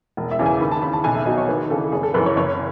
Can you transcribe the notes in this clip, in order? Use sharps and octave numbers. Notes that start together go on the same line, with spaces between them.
E1
E5
E2 C#3 E3
G#5
D#2 B5
A5
C#3 E3 B5
A5
B1 G#5
E5
B2 F#3 D#5
C#5
D#2 B4
C#3 E3 A4
F#1 G#4
A4
F#2 E3 B4
C#5
F#1 C#5